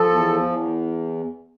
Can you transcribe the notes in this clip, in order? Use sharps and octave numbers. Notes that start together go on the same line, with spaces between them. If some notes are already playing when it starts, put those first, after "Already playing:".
Already playing: F3 A4
E2
E2